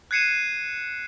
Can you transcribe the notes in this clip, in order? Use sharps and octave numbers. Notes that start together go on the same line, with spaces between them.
F#6 G#6 C7 C#7 D#7 E7